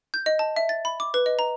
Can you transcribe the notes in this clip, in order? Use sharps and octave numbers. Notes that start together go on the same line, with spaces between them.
G6
D#5
A5
E5
A6
B5
D6
B4
D#5
A#5